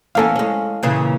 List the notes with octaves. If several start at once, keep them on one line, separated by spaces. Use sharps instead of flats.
E2 A#3 C#4 A4 F5
G#3 C#4
A#2 C#3 E3